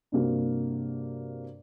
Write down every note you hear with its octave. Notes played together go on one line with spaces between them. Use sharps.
G2 C3 A#3 F#4